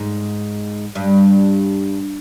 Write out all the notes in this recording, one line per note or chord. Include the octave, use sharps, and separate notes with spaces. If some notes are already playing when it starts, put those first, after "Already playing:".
Already playing: G#2
G2